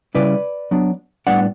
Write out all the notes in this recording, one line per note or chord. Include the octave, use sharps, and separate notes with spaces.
C#3 G3 C#4 E4 B4 D5
F#3 B3 D4
A2 G3 B3 D4 D5 F#5